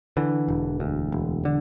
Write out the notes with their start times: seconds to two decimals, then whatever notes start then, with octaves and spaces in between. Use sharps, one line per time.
0.17 D3 E3
0.48 E1
0.80 D2
1.12 E1
1.45 D3